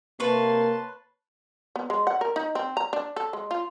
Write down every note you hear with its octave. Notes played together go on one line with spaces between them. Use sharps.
C3 A#3 B4 C#5 A5 C6
B3
G#3
F#5
A#4
D#4
C4
A#5
D4
A4
G#3
F4